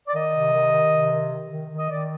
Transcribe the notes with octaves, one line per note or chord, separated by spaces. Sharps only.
D5
D#3 D#5
C3
D#3
D#3
C3
D#3
D#3
D#3
D#3
D#5
D#3 D5